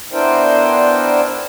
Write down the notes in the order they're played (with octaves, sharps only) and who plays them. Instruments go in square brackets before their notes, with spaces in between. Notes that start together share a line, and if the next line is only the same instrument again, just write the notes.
[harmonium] B3 D4 E4 A#4 C5 G5